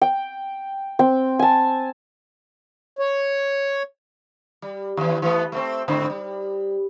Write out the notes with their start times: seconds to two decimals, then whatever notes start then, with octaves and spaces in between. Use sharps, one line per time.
0.01 G5
0.99 C4 G5
1.39 G#5 A5
2.99 C#5
4.62 G3
4.97 D#2 E3
5.22 E3 A3 B3
5.52 A3 B3 C4
5.88 G#2 D3 C4
6.10 G3